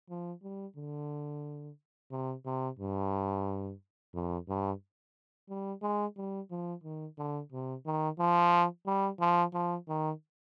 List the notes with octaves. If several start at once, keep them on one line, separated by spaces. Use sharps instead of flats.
F3
G3
D3
C3
C3
G2
F2
G2
G3
G#3
G3
F3
D#3
D3
C3
D#3
F3
G3
F3
F3
D#3